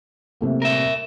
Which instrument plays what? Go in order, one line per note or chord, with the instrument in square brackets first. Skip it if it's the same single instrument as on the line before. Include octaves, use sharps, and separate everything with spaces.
[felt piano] C3 A3 A#3
[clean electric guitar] A#4 E5